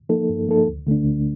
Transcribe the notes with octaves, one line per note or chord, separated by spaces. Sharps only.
F3 A#3 D#4 A4
G2
F3 A#3 D#4 A4
D2
D3 A3 D4
D2